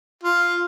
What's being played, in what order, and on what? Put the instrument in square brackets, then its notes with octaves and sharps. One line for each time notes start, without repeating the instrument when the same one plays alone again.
[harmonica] F4